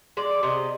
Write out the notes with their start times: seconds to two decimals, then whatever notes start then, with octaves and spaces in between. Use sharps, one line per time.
0.17 G#3 D5
0.43 C3 D#5